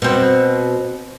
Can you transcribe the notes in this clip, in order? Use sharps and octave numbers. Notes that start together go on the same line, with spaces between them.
B2 C4